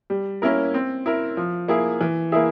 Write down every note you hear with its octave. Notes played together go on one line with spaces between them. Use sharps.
G3
A#3 C#4 E4 A#4
C4
E4 A#4
F3
A#3 E4 G#4
E3
A#3 E4 G#4 E5